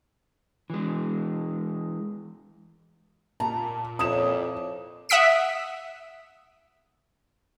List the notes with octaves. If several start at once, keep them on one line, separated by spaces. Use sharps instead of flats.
E3 G#3
A#2 A5 A#5
F2 D4 E4 C#5 D#6 E7
E5 F#5 D#6 B6 D7